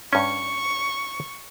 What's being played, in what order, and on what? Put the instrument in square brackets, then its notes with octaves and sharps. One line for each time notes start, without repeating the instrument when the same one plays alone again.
[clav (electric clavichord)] G2 C#4 [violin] C#6